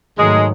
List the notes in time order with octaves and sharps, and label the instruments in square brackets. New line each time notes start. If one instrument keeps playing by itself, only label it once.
[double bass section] G#2 D#3 F#3 A3 [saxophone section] G#3